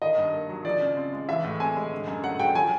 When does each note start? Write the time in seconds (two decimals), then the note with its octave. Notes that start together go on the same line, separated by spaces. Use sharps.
0.02 D#3 D#5
0.18 G2
0.33 A#3
0.49 F#3
0.65 F3 D5
0.81 C#3
0.97 C4
1.13 G#3
1.29 E3 E5
1.44 A2
1.60 C4 G#5
1.76 G#3
1.92 D3
2.07 F#2
2.24 A3 F#5
2.39 F#3 G5
2.55 F3 G#5